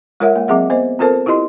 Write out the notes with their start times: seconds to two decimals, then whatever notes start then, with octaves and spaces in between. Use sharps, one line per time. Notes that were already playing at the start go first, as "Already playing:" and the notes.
0.20 G#3 F4 A#4 C#5 E5 F#5
0.36 G#3 A#3
0.48 F#3 C4 G#4 E5 F#5
0.70 B3 C5 D#5
0.99 C4 F4 A4 A#4 C5 A5
1.26 E4 F4 G4 D#5 C6